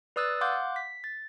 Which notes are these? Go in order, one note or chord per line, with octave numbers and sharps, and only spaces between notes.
B4 D5 D#6 E6 F#6 A6
F5 F#5 C6 D6 F#6 G6
B6
A6